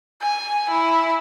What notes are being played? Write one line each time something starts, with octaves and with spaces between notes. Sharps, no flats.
G#5
E4